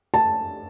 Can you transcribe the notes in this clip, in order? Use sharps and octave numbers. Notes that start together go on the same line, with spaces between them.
A5